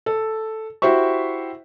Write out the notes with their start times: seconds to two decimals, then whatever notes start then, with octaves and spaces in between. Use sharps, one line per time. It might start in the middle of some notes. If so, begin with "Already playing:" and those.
0.06 A4
0.82 E4 F#4 G4 C5 E5 C#6